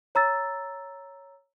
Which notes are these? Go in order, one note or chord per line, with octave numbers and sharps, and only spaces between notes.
C#5 A#5 E6 A6